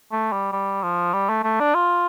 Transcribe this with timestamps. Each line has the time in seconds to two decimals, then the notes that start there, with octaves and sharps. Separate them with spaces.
0.12 A3
0.33 G3
0.52 G3
0.83 F3
1.13 G3
1.29 A3
1.44 A3
1.60 D4
1.75 F4